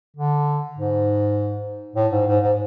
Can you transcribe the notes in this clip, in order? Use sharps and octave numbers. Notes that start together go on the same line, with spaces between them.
D3
G#2
A2
G#2
G#2
G#2